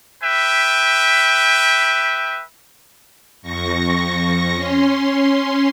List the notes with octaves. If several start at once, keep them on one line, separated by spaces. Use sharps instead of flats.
B4 E5 G5
F2 C#6 A#6
C#4 C6